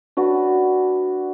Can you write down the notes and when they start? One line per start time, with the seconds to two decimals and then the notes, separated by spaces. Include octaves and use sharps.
0.17 D4 F#4 B4